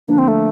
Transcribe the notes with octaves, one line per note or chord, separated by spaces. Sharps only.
D3 F3 A#3 D4
C4
A3